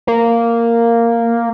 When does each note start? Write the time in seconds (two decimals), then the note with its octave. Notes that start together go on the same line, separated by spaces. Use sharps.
0.07 A#3